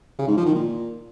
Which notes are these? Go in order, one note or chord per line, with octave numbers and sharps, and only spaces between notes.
C#3
G#2
F3
D#3
A#2